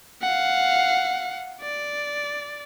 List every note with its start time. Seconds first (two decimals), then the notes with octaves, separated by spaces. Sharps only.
0.22 F5 F#5
1.61 D5